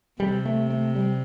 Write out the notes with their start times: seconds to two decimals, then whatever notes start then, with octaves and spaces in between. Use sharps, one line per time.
0.19 C3 G3
0.45 A3
0.70 A3
0.95 G3